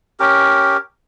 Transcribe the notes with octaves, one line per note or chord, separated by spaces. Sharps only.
C#4 G4 A#4